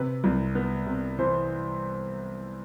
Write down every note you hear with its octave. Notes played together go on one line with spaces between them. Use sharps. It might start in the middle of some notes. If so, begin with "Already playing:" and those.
Already playing: C3 B4
C2
B3
C3
E3 C5